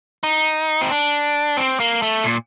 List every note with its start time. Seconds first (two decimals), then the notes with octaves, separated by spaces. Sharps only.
0.24 D#4
0.81 C4
0.91 D4
1.57 C4
1.80 A#3
2.02 A3
2.23 A#2